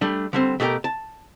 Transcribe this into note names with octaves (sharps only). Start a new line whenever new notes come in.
G3 A3 D4
D3 G3 C4
B2 A3 F#4 G4 A#4
A5